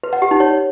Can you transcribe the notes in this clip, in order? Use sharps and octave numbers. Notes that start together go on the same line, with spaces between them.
B4
F#5
G4
D#4
C#5